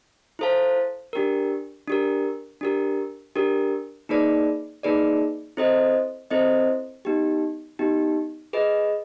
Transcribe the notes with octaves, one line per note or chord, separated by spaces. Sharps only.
E4 A4 C5 F5 A5
D4 G4 A#4
D4 G4 A#4
D4 G4 A#4
D4 G4 A#4
A#3 D#4 G#4 B4 D5
A#3 D#4 G#4 B4 D5
C4 E4 A4 C5 D#5
C4 E4 A4 C5 D#5
B3 D#4 G4
B3 D#4 G4
G#4 B4 D#5